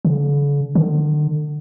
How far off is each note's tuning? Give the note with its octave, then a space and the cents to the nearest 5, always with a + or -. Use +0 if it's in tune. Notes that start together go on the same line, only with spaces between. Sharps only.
D3 -45
D3 +35